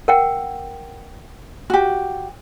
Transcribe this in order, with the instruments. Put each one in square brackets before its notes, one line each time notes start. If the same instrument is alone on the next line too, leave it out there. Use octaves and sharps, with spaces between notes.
[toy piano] A#4 F#5 G5
[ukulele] F#4 G4